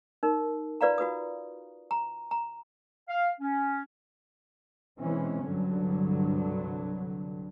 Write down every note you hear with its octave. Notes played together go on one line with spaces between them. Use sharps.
D#4 A#4
F4 B4 D5 F5 A#5
F4 F#4 B4 D#6
A#5
A#5
F5
C#4
B2 E3 G#3 C4 C#4
C2 G2 D3 F#3